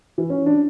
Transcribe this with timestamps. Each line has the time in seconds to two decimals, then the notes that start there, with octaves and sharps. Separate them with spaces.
0.18 E3
0.30 C#4
0.46 D4